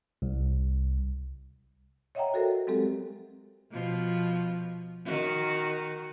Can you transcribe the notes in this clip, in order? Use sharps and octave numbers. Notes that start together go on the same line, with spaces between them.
C2
C#5 D#5 E5 F#5 G5 A#5
F#4 A4 A#4 C5
F#3 G#3 C4 G4 A4
B2 F3
D#3 F#4